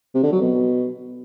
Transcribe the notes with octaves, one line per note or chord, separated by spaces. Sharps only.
C3
D3
F#3
B2